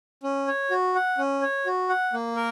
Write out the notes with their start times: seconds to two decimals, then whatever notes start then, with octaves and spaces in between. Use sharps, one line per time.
0.23 C#4
0.48 C#5
0.71 F#4
0.95 F#5
1.18 C#4
1.42 C#5
1.66 F#4
1.89 F#5
2.13 A#3
2.36 A#4